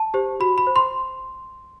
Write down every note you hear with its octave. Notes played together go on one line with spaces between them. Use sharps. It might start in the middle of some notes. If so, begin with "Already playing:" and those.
Already playing: A5
G4 C5
F#4 B5
B5
C5
C6